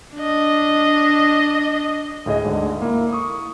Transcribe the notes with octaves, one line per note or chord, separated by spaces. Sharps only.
D4 D#5
D2 A2 G#4 D#5
D2 G#2 D3
A#3 E4
C#6 D#6